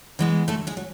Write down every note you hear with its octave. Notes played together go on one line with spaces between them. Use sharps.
E3 G#3 B3
D2 A3 A4
G#3 G#4
F#3